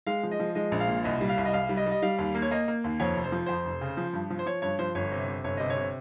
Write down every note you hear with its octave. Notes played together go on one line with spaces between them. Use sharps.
G#3 F5
F3
D#5
F3
G#3 D#5
A#1
F5
A#2
C2 D#5
G3
F5
C2
D#5
C2 F5
G3
D#5
G3
D#5
G3 F5
D#2
A#3
C#5
A#3 D#5
A#3
D#2
F2 C#5
F1
C5
F3
F2 C5
F1
C#3
F3
G2
F3
C5
F3 C#5
G2 C#5
F3 C5
G1 C#5
C3
C3
G1 C#5
C3 D#5
C#5
C3